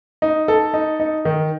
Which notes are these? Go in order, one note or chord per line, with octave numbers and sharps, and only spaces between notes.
D#4
A4
D#4
D#4
D#3